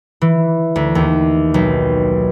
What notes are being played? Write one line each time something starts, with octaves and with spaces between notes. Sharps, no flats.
E3
D2
D#2
B1